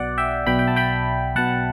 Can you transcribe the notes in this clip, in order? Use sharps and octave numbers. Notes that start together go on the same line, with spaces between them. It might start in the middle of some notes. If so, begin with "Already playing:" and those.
Already playing: B1 B2 D5 F#5
E5 G5
B1 B2 G5 B5
G5
A5
G5 B5
B1 B2 F#5 A5